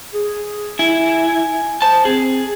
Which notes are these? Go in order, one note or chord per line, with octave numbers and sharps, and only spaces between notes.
G#4
E4 G#5
C5 A5
C4 G#4